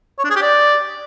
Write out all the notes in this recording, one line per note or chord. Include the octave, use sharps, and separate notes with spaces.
C#5
D4
G#4
G4
D5